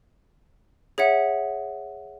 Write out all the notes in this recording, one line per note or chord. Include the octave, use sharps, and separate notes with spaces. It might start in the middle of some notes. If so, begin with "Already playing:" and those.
G#4 C#5 E5 F#5